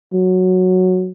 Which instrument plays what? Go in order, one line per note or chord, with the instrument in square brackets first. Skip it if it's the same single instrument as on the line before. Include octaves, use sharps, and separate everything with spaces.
[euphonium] F#3